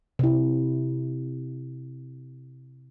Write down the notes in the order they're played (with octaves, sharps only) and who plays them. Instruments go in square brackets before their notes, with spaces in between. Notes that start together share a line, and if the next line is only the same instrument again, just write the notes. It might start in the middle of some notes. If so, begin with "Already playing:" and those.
[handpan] C3 E4